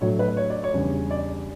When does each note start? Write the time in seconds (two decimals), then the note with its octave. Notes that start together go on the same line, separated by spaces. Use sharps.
0.01 A2 F#3 A3 D4 C#5
0.19 B4
0.37 C#5
0.50 D5
0.64 C#5
0.73 E2 C#3 G3 D4
1.11 D5